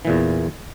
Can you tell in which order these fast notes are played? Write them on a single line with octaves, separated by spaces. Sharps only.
E3 A#2 E2